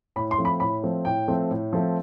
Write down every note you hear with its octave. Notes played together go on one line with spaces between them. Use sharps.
A2 B5
C6
F3 A3 C4
B5
A2 B5
F3 A3 C4
A2 G5
F3 A3 C4
A2
F3 A3 C4